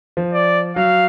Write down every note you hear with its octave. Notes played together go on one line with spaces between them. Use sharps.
F3
D5
F#3 F5